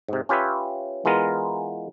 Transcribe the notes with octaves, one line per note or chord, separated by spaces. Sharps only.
G#2 C3
C#4 F4 G4 B4 C#5 E5
E3 G#3 B3 F4 A#4